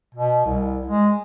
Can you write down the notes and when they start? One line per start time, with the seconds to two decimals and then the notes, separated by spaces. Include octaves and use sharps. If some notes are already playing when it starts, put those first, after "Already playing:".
0.15 B2
0.45 C2
0.86 G#3